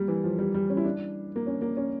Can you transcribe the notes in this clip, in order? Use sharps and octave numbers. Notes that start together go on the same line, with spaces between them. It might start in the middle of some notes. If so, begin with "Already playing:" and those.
Already playing: G3 A#3
E3
F3
G3
G3
C#4
E4
D4
A#3
C#4
A#3
C#4